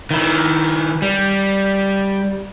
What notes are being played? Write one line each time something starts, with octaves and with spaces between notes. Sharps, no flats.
D#3 E4
G3